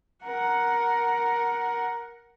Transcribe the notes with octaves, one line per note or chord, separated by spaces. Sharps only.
A#4 F#5